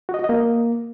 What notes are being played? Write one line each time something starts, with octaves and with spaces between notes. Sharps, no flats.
F#4
D#5
F#4
D#5
A#3